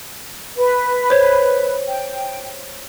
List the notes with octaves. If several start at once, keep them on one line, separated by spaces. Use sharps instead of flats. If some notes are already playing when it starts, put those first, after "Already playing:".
B4
C5 C#5
G5